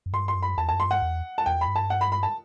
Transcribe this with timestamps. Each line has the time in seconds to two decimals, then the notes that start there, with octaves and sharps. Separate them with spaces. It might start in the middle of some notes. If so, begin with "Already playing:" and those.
0.06 F#2
0.13 G2 C6
0.28 C6
0.35 F#2
0.42 B5
0.58 E2 A5
0.69 F#2 A5
0.80 C6
0.87 G2 F#5
1.02 E2
1.38 A5
1.46 E2 G5
1.61 B5
1.68 G2
1.76 A5
1.90 F#5
2.01 B5
2.12 B5
2.23 A5